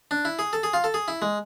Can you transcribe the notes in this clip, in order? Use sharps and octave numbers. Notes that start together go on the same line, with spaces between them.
D4
E4
G#4
A4
G#4
F4
A4
G#4
E4
G#3